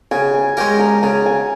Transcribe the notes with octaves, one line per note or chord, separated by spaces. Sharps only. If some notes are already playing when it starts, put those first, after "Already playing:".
C#3 G#5
G#5
G#3 C#4 G4 A#4 G#5
A#5
C#3 A#5
G#5